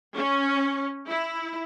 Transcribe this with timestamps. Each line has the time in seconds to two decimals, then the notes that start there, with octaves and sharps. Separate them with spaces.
0.15 C#4
1.08 E4